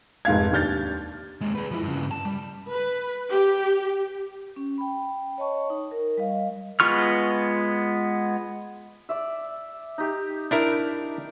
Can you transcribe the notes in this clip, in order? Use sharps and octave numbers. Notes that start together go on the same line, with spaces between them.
F1 G#2 F5 G#6
D#2 D4 F6 G6 A6
D#2 G#3
G#4 B4
F3 E4
G2 C#3
A5
G3
B4
G4
C#4
G5 B5
C#5 D#5 A5 C#6
D#4
A#4
G3 D#5 F5
G#3 B3 F4 C#6 F6
D5 E5
D#4 G4
D4 E4 A#4